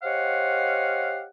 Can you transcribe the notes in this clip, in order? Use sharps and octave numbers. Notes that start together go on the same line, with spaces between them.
G4 C5 C#5 D#5 F5 F#5